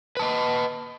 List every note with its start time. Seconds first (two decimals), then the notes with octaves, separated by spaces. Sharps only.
0.17 B4
0.19 A5
0.22 D#5